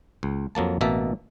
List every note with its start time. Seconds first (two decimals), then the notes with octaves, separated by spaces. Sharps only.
0.23 C#2
0.55 F2 F#3 A#3 A5
0.81 A1 B2 A#3 E5 A5